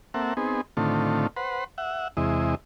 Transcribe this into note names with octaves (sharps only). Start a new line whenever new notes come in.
A#3 C4 A4 E5 F#5
B3 C4 D#4 G#4
A2 D3 D#3 A3 C4 F4
B4 C5 F#5
E5 F#5
E2 C3 G#3 E4 D#5